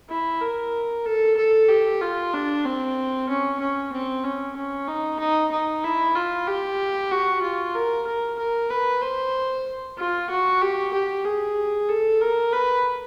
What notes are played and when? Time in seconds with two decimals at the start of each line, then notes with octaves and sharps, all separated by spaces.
0.09 E4
0.41 A#4
1.05 A4
1.37 A4
1.68 G4
2.01 F4
2.33 D4
2.65 C4
3.29 C#4
3.60 C#4
3.92 C4
4.23 C#4
4.56 C#4
4.87 D#4
5.19 D#4
5.52 D#4
5.83 E4
6.15 F4
6.47 G4
7.11 F#4
7.42 F4
7.75 A#4
8.07 A#4
8.38 A#4
8.70 B4
9.02 C5
9.97 F4
10.29 F#4
10.62 G4
10.93 G4
11.25 G#4
11.89 A4
12.21 A#4
12.53 B4